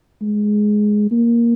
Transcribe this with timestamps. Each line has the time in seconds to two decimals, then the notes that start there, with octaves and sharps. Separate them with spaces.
0.22 G#3
1.12 A#3